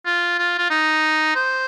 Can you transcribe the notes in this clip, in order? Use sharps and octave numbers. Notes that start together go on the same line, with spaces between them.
F4
F4
F4
D#4
C5